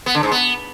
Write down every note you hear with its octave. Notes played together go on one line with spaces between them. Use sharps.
B3
D3
G#2
B3